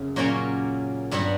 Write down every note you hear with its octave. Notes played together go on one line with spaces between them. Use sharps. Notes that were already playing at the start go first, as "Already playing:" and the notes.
Already playing: F#2 C#3
A#2 F#3 A#3 C#4
G2 F#3 B3 D4